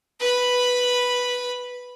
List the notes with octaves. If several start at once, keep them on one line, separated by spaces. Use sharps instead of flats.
B4 B5